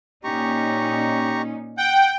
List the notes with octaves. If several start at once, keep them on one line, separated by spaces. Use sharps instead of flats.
A#2 C#4 D#4 G4 A#5 C#6
F#5 G5